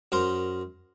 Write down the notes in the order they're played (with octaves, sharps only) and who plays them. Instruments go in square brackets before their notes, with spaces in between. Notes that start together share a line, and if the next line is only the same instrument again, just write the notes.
[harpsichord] F#2 A#4 C5 C6